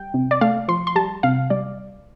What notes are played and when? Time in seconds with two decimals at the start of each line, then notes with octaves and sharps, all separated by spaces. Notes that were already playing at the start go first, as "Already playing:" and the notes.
Already playing: G3 G5
0.14 C3
0.31 D5
0.41 A3 F5
0.68 F3 C6
0.87 C6
0.96 G3 A5
1.23 C3 F5
1.50 G3 D5